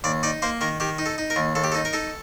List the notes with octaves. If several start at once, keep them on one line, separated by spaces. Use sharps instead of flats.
D#2 D5
D#4 D5
A#3 C5
D#3 A#4
D#3 G4
D#4
A4
D#4
A#4
D#2
D#2 A4
G4
A4
D#4
A#4
D#4 A4